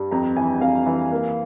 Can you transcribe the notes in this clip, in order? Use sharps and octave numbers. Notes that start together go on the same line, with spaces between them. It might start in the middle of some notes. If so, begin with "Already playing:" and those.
Already playing: G2 G3
F2 A#5
E3 G#5
F2 F5
E3
A#3